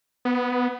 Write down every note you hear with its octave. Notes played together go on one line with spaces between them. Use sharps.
B3